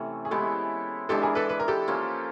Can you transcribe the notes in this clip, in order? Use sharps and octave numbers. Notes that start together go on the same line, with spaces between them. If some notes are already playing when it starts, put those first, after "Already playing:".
Already playing: C3 E3 A3 C#4
G#4
G#3 B3 E4 G4 A4
E3 G#3 B3 D4 G4 A4
G#4 A#4
A4 B4
B4
A#4
G4 A4
F3 A#3 C#4